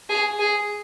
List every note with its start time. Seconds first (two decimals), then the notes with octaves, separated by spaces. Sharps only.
0.09 G#4
0.39 G#4